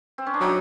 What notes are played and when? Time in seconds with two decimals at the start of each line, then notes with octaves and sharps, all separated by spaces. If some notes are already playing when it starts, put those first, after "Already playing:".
0.18 C4
0.26 C#4
0.34 D4
0.41 F#3 D#4